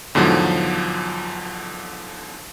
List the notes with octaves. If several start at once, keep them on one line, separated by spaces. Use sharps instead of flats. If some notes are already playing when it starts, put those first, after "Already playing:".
E2 G#2 D3 F3 F#3